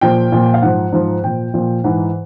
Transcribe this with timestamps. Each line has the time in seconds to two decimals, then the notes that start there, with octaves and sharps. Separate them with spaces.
0.01 A#2 F3 G5
0.32 A#2 F3
0.54 F5
0.62 G#2 F3 F#5
0.92 G#2 F3
1.23 A#2 F3 G5
1.54 A#2 F3
1.84 G#2 E3 F#5